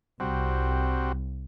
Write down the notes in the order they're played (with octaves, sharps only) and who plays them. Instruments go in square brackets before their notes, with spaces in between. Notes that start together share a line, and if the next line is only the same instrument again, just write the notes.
[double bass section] C2 [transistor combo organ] G3 C4 F#4